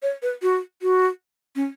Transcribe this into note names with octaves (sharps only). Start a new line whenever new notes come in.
C#5
B4
F#4
F#4
C#4